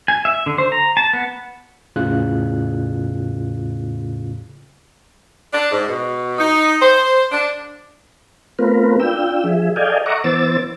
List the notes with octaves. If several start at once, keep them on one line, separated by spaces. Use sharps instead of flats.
G#5
E5
D3
C5
A#5
A5
B3
B1 E2 A2 C#3 F4 F#6
D4
G#2
B2
D#4
C5
D4
A3 B3 C4 F4 A#4 B4
D4 F4 G5 E6
F3 G#4 E5
A4 D5 D#5 F5 G5 G#5
D#5 E5 F#5 A#5 C#6 D6
E3 B3 C5 D6 E6 A6